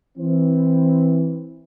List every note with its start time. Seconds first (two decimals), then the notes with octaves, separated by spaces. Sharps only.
0.17 E3 C4